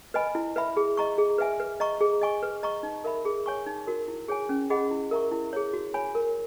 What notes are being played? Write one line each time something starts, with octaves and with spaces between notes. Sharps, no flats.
B4 D#5 G#5 B5
E4
B4 E5 B5
G#4
D#5 A#5 C#6
G#4
B4 E5 G#5
B4
D#5 A#5 C#6
G#4
D#5 G#5 C#6
B4
D#5 A#5 C#6
D#4
A#4 E5 B5
G#4
C#5 G#5 C#6
D#4
F#4 A#4
E4
G#4 C#5 G#5
C#4
G#4 D#5 F#5 B5
E4
A#4 E5 A#5 C#6
E4
G#4 C#5
F#4
C#5 G#5 B5
A#4